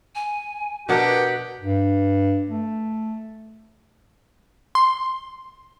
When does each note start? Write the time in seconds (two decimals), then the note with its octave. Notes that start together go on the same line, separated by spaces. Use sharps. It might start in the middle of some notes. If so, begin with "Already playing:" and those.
0.15 G#5
0.89 B2 D4 G4 A#4 B4 F#5
1.61 G2
2.50 A3
4.75 C6